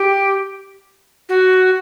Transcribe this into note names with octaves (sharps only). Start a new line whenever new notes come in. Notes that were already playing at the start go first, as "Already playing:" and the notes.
Already playing: G4
F#4